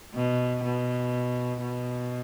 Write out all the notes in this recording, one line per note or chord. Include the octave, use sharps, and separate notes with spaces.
B2
B2
B2